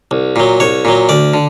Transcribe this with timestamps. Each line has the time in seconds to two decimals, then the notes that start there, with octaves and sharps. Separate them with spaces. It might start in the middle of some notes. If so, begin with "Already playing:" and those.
0.11 C2
0.36 A#2 F#3
0.60 C2 C#5
0.85 A#2 F#3
1.09 D2 D5
1.34 D3